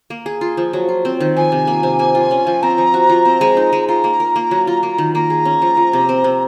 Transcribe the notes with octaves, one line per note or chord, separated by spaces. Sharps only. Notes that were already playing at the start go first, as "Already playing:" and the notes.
A#3
G#4
F4
F3
F#3
F4
C4
D#3
F3 G#5
C3
A#3
C3
A#3
F4
C#4
F3
C4 A#5
F3
F#4
F3
C4
G#3
D#4
G#3
F4 A#5
A#3
A#4
A#3
F#3
F4
A#3
D#3
A#3 A#5
G#4
C#4
F3
F3
C3
C4
C3